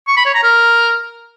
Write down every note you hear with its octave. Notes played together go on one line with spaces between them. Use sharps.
C#6
B5
C#5
A#5
A#4